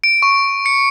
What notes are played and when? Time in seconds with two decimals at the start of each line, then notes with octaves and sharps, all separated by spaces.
0.04 D7
0.22 C#6
0.66 C#7